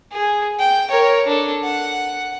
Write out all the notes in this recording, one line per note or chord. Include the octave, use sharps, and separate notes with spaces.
G#4
G5
A#4 C#5
D4 A4
F#5